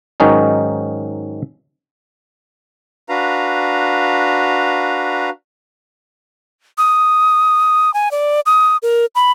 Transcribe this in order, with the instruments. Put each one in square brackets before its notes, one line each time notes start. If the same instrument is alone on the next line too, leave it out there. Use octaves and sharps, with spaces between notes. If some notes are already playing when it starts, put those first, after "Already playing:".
[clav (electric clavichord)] G#2 D#3 F#3 C#4 D#4
[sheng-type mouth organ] D4 F#4 B4 F5 A#5
[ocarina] D#6
G#5
D5
D#6
A#4
B5